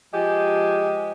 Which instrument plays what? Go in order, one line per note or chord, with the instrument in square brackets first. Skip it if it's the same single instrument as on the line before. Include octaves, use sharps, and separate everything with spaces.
[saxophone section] F3 G#3 G4